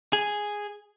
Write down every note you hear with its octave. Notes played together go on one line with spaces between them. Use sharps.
G#4